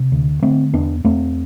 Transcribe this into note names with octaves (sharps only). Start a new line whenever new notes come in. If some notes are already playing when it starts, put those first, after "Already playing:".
Already playing: C3
D2
D3 A3 C4
E2 B3 D4
E2 A3 C4